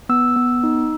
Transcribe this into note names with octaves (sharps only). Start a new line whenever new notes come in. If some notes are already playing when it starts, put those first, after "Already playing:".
B3 E6
B3
D#4